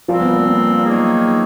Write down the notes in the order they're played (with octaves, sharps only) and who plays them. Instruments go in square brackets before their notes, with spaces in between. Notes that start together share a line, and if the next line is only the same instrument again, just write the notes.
[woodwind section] A#2 G3 C4 [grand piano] F3 F4
[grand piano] B3
A#3
B3
[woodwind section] D#3 F#3 A#3 D#4 G#4